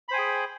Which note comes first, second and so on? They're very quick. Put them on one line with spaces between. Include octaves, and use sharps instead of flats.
B5 C5 G#5 G5 G#4